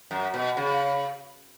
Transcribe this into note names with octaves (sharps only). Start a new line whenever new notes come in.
F#2
B2
C#3